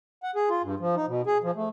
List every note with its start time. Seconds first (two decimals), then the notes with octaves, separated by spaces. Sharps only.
0.23 F#5
0.36 G#4
0.50 F4
0.63 G2
0.80 F3
0.96 D#4
1.08 B2
1.27 G#4
1.44 F3
1.55 A3